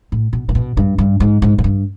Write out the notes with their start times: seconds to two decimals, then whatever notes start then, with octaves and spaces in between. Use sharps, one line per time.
0.12 A2
0.33 B2
0.49 A#2
0.55 B2
0.77 G2
0.98 G2
1.20 G#2
1.42 G#2
1.58 G#2
1.64 G2